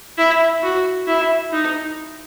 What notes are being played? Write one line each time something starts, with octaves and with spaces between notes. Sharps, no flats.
E4
F#4
E4
D#4